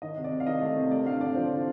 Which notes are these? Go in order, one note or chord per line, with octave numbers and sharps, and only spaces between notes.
D#3 D#5
C3
D5
C3
F5
D#3 D#5
A3
C3
A3 D5
D3 F5
D3 D5
F3 C5
D3